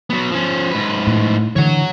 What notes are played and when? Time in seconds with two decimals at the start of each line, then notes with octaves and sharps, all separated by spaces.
0.10 F#3 B3
0.31 F3 C#4
0.71 G#2 B4
1.07 A2
1.56 D3 E3 C#5 F#5